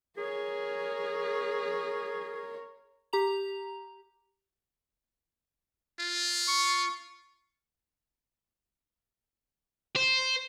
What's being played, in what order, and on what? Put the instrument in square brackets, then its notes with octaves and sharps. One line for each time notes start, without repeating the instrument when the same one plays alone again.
[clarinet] G#4 [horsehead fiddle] A#4 C#5
[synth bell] G4 A#5 F7
[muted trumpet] F4
[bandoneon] C#6
[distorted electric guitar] C5